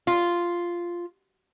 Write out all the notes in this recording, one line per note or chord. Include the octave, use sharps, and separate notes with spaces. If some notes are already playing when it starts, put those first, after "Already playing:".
F4